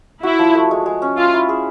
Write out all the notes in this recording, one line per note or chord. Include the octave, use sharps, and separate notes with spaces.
E4 F#4
F3
A3
G#3
G#3
C#4
F4 E5
E4
G#4